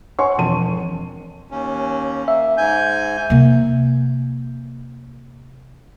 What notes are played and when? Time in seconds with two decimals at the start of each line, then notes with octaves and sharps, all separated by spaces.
0.19 C#5 F#5 G#5 C6 C#6
0.38 E1 F2 A5 D#7
1.51 D#2 C#4
2.28 A#3 E5
2.57 G#2 G#5 G6
3.30 C3 A#3